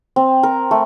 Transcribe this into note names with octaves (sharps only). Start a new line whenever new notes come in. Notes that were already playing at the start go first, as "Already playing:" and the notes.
C4
A#4
A3